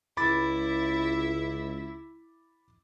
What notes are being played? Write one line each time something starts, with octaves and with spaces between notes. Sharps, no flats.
C#2 E4 E5 B5 D6 A6